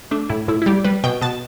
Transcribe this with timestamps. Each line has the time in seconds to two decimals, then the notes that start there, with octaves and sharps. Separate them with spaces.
0.11 A3 D4
0.29 A2 E4
0.48 A2 E4
0.62 E4
0.66 G3 G4
0.84 G3 B4
1.04 B2 G5
1.21 B2 A5